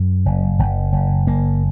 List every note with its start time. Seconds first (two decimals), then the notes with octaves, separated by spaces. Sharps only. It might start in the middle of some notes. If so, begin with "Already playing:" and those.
Already playing: F#2
0.26 F#1
0.59 F#1
0.92 F#1
1.27 F#1 A#3